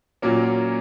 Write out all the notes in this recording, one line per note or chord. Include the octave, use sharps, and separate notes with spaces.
A#2 F#3 A#3 C#4